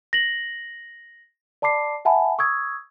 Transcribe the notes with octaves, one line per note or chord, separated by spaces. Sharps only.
A#6 F#7
D5 A5 B5 D6 C7
E5 F#5 G#5 A5 B5
C#6 D#6 E6 G#6